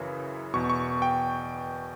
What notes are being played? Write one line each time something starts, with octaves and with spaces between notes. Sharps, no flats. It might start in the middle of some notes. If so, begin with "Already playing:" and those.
Already playing: F#2 C#3 E3
E2 B2 C#6
C#6
G5